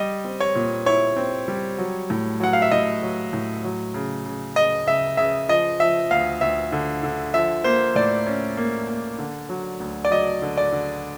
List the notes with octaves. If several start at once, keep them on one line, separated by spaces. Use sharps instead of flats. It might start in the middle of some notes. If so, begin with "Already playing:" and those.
Already playing: G3 D#5
C4
C#5
A#2
E4 C#5
C4
G3
F#3
A2
F#3 F#5
F5
E5
A2 D#5
F#3
A2
F#3
C#3
C#3
C#3 D#5
C#3 E5
C#3 E5
F3 D#5
F3 E5
D2 F5
D2 E5
D3
D3
F3 E5
A#3 C5
A2 D5
C#4
A#3
A#3
D3
F#3
D2
D5
F#3 D#5
D3
D5
D3